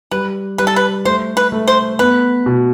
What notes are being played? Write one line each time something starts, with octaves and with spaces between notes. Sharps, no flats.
G3 B4
G3 B4
A4
B4
A3 C5
B4
A3
C5
B3 B4
B2